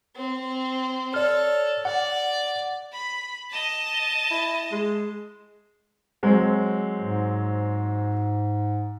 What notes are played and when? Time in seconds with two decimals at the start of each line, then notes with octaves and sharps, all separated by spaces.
0.16 C4
1.14 A4 C#5 D5 F6
1.85 D5 F#5
2.93 B5
3.51 D#5 A5
4.31 E4
4.72 G#3
6.23 F#3 G#3 C4
7.01 G#2